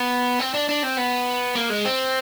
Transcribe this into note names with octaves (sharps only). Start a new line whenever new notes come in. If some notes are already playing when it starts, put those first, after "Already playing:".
Already playing: B3
C4
D4
D4
C4
B3
A#3
G#3
C4